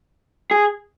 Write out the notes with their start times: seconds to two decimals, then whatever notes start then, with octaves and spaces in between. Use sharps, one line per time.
0.51 G#4